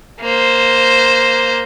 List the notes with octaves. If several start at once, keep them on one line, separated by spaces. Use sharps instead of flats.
A#3 C5